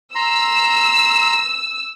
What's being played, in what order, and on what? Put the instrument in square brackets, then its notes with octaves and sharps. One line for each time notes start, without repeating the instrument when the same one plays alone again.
[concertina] A#5 C6 [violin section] E6